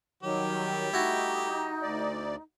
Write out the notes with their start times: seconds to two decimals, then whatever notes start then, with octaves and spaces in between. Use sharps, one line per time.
0.23 D#3 F#3 G3 G4
0.93 A3 D#4 E4 F#4
1.82 D2 D5